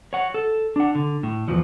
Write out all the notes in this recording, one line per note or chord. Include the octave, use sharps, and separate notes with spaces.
C#5 F#5
A4
D4 F#5
D3
A2
E2 F3 F#3